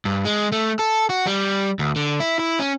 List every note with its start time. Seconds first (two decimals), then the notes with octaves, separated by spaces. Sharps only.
0.05 G2
0.25 G#3
0.52 A3
0.79 A4
1.10 F#4
1.27 G3
1.79 D2
1.96 D3
2.20 E4
2.39 E4
2.59 C#4